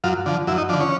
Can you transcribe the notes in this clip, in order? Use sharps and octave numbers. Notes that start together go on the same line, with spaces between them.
F#2 F4
D3 F3
F#2 E4
D#4
D3 F3 D4
C#4